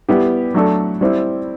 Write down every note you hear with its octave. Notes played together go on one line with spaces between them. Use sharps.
G3 B3 E4 G4
F#3 A3 D4 A4
G3 C4 E4